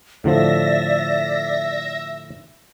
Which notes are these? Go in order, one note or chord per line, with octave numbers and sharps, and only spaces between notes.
A2 D3 F3 D5 E5 A#6